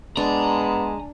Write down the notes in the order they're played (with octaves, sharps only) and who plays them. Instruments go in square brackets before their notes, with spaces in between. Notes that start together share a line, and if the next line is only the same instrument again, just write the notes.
[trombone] G#3 [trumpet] B3 [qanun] D4 [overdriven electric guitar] G#5 A#5